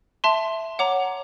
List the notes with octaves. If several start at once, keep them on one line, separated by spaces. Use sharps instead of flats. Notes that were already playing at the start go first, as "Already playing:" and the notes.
E5 A5 C6
C#5 F#5 A#5 D6